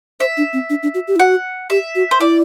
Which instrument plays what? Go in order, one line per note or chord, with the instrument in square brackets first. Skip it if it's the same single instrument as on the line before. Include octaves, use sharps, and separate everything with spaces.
[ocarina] C5 [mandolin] E5
[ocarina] D4
C4
D4
D4
F#4
G4
E4
[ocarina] F#4 [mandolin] F#5
[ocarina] G4 [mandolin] E5
[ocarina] F#4
[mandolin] C5
[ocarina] E4 [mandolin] D5